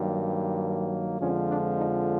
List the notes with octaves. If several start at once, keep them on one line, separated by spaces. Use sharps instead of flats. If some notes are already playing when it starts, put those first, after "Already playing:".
Already playing: G2 D#3 F#3 A#3
F2 D3 F3 G#3 C#4
D4
D#4